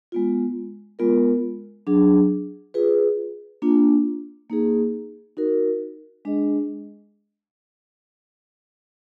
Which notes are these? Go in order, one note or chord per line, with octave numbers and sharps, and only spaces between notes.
G#3 B3 F4
G#3 B3 F4 A#4
F#3 D4 G#4
F4 G#4 B4
A#3 D4 F4
A#3 D#4 G#4
D#4 F#4 A#4
G#3 D4 G#4 D#5